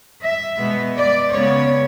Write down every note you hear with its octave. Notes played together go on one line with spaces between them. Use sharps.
E5
B2 G#3 B3
D5
C#3 G#3 B3 C#5